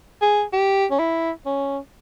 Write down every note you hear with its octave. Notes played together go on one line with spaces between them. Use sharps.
G#4
G4
C#4
E4
C#4